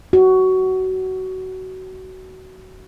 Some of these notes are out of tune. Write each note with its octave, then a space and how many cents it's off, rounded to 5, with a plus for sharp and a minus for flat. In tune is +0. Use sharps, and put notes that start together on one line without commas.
F#4 +20